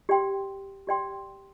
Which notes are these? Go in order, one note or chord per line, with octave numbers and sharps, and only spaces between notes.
G4 D5 G5 C6
G4 D5 G5 C6